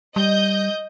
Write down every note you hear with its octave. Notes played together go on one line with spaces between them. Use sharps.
G3 D#5 G6